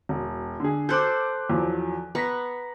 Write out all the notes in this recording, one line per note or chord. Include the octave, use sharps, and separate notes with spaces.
E1
D3 G#4
A4 C5 D6 F#6 G6
E2 F3 F#3
B3 A#5 C#6 A#6 B6